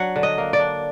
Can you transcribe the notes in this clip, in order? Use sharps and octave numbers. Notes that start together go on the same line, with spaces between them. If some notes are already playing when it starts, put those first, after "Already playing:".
Already playing: F#3 D4 F#5
D3
D#5
A#3
D5
D4